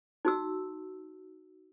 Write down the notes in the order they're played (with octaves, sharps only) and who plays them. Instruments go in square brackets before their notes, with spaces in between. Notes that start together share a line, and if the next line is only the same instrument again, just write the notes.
[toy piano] D#4 F#4 E6